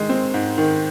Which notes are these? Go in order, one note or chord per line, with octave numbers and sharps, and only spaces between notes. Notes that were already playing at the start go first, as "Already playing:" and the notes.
Already playing: D#3 G#3
C4
G#2
D#3